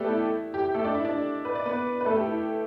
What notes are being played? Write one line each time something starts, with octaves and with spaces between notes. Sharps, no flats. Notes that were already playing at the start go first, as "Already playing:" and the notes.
Already playing: A3 B3 G4 A4 D5
E4
G4
G4
A3 A4
D4 D5
E4 E5
D4 D5
B4
D5
B3 B4
B4
A3 A4
G4
E4